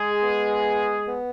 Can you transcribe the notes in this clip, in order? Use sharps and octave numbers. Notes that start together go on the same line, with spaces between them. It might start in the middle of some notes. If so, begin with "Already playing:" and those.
Already playing: G#3 G#4
B3
B3